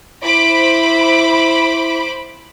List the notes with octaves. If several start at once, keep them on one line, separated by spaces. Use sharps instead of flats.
E4 C5 B5 D6